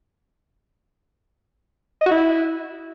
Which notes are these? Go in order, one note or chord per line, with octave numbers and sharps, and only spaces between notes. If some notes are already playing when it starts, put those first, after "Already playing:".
D#5
F#4
E4